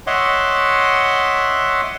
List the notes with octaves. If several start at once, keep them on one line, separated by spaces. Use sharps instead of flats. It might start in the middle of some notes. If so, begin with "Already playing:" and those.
C#5 D#5 E5 F#5 C6 D6